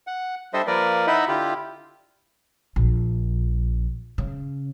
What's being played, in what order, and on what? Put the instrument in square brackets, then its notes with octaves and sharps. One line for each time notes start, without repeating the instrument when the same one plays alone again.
[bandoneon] F#5
G3 D4 A4 C5 D#5 E5
F3 A#3 A#4 B4 D5
D#4 E4 D#5 E5 F#5 B5
D3 E4 F4 G4
[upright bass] A#1
C#3